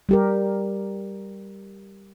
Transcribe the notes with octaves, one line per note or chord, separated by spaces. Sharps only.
G3 G4 A#4